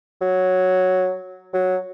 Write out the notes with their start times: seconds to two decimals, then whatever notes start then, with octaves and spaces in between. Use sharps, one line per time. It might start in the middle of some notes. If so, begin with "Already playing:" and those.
0.21 F#3
1.54 F#3